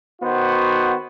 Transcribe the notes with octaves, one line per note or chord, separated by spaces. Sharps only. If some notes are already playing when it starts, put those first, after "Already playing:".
D#3 B3 F#4 C5